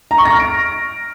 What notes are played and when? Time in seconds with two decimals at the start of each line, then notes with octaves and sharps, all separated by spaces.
0.11 A#5
0.18 C#6
0.25 A#6
0.33 F6
0.40 D7